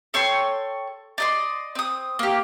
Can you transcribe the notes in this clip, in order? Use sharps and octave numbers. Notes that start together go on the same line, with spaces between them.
A4 C#5 G5 C6
D5 D#5 C6
C4 D#6
A#3 G4